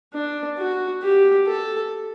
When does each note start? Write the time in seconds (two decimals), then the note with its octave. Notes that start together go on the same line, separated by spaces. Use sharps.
0.14 D4
0.58 F#4
1.03 G4
1.47 A4